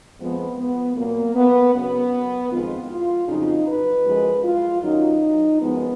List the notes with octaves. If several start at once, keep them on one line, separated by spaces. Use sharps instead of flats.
F2 F3 G#3 B3
B3
A#2 F#3 A#3
B3
F#2 C#3 F#3 B3
F2 D#3 G#3 F4
F4
F2 C#3 F#3 D#4
B4
F#2 F3 G#3
F4
F#2 D#3 F#3 D#4
F#2 F3 G#3 B3